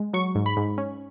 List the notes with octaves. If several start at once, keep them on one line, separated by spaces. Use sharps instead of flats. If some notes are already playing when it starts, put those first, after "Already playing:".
Already playing: G#3
F#3 C#6
G#2
B5
G#2
C#4